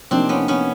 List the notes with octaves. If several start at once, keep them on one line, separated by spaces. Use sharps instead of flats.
C3 F3 A#3 C4 D4 D#4
B3 C#4
B3 C#4